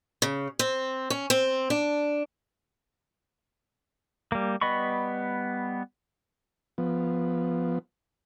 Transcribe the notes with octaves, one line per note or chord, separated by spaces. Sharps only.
C#3
C4
C#4
C4
D4
G3 A#3
G3 B3 D#5 B5 C#6
F3 B3